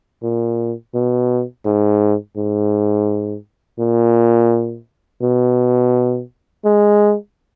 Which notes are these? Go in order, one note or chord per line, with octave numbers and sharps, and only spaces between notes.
A#2
B2
G#2
G#2
A#2
B2
G#3